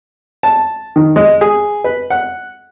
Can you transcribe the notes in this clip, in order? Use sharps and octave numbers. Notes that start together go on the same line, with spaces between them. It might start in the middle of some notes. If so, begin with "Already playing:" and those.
A5
D#3
G#3
G#4
B4
F#5